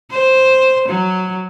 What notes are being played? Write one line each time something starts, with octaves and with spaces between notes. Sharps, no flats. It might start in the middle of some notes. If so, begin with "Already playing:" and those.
C5
F#3